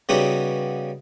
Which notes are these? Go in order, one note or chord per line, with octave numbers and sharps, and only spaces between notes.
C#3 G3 B3 D#4 F#4 G4